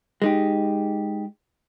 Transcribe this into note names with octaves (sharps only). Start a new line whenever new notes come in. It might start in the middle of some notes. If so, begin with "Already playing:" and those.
G#3 D#4 G4